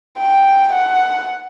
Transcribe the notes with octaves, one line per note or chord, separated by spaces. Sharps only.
G5
F#5